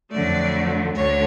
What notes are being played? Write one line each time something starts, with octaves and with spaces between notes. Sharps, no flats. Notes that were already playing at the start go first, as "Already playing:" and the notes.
F2 D3 F#3 A3 D5
D2 D3 C#5